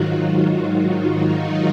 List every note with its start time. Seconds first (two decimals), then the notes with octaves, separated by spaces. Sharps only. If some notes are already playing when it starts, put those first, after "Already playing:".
Already playing: G#2 D#3 F#3 F4 F#4
0.37 D#4